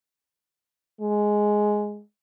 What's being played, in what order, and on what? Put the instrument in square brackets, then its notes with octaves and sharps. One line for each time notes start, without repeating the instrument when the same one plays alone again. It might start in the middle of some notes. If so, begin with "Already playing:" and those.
[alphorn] G#3